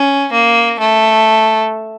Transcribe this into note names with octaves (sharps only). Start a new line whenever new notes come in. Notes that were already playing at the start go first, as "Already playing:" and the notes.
Already playing: C#4
A#3
A3